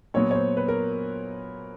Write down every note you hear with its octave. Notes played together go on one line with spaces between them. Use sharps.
A#2 F#3 B3 C#5
C#5
C5
B4
A#4